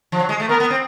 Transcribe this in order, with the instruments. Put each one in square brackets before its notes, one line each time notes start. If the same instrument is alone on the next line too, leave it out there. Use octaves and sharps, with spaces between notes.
[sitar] F3
F#3
G#3
A3
[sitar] B3 [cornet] A#4
[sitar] B3
C4